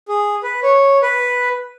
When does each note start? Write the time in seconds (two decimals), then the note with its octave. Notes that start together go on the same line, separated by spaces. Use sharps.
0.08 G#4
0.43 B4
0.63 C#5
1.02 B4